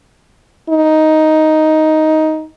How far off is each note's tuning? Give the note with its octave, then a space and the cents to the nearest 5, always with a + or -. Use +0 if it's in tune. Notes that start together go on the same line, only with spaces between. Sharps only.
D#4 +5